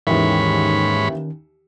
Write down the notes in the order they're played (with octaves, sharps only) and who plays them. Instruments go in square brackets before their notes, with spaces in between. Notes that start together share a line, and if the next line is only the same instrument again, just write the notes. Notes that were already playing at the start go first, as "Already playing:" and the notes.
[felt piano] D#2 E3 E5 [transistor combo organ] G#2 C#5 B5 [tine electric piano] D#3 C#4